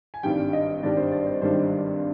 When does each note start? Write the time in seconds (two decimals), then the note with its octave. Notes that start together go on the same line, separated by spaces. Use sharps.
0.14 G#5
0.23 G#1 G2 D#3 G3 D4 G5
0.53 D#5
0.83 G#1 G2 D#3 G3 D4 D5
0.97 C5
1.12 D5
1.27 C5
1.41 G#1 G2 D#3 G3 D4 C5